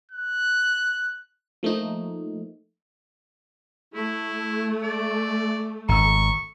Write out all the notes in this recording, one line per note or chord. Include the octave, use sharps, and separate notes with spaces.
F#6
F3 A3 A#3 D#4
A3 E4
D5
G#1 A#5 C#6 E6